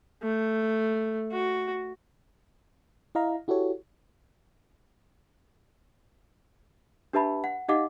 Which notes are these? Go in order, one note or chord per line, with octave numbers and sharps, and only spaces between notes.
A3
F#4
E4 D#5 F5 A#5
E4 F#4 G4 A4 C#5
D4 G4 B4 E5 A5 B5
F#5
D#4 G4 D#5 F5 F#5 D6